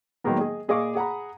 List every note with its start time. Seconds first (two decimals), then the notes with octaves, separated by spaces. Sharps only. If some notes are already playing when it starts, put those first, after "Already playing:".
0.24 D#3 F#3 G#3 A#3 B3
0.38 G#4 D#5
0.68 A#2 G#4 D#5 F5 C#6 D6
0.95 G#4 F#5 A#5 B5